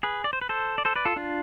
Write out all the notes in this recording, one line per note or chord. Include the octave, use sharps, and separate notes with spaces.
G#4 B4
D5
C5
B4
A4 C5
D5
A4 C5
B4 D5
F4 A4
D4 F4